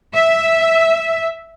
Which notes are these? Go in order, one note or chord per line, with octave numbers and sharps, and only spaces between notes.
E5